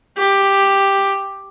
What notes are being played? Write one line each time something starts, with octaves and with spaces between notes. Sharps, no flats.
G4